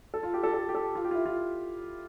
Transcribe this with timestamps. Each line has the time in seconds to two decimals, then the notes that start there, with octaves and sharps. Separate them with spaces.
0.14 A4
0.23 F4
0.34 G4
0.43 A4
0.54 A4
0.69 G4
0.75 A4
0.95 F4
1.05 G4
1.11 F4
1.15 E4
1.26 F4